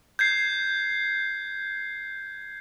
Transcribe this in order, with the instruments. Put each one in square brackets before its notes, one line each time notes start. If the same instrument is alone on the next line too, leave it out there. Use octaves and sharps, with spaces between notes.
[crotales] G6 G#6 C7